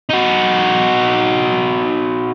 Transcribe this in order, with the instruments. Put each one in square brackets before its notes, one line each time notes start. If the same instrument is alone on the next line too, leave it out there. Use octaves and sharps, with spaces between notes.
[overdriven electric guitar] D#4 F#4